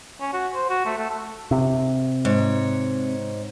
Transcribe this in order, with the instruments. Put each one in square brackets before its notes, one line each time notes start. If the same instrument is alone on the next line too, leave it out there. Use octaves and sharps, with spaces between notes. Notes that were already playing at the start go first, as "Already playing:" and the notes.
[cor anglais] C#4
F#4
C5
F#4
A3
A3
A4
[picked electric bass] C3
[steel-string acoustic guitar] G#2 C#5